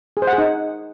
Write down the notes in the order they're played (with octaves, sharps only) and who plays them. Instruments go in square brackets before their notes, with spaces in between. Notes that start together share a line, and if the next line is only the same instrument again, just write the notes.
[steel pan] G#4
C5
F#5
G#4
D#4